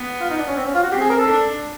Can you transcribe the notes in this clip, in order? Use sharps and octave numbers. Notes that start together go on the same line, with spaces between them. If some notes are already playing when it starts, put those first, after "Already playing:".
Already playing: B3
F4
D#4
D4
C#4
C4
C#4
F4
F#4
C4 G4
G#4
A#4
A4
D4